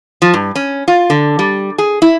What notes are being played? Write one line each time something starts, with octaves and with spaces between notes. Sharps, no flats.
F3
G2
C#4
F4
D3
G3
G#4
E4